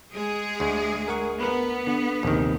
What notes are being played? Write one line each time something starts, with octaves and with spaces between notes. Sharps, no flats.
G#3 G#4
D2
A#4 F#5 C#6
B3 A#4 B4
D3
A#1 D#2 C3 D#3